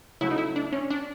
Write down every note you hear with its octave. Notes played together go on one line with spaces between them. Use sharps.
C#3 F#3 A3 E4
D#4
E4
D4
C#4
D4